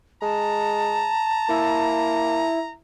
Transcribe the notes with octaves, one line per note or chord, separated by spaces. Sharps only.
G#3 A5 A#5
A#3 E4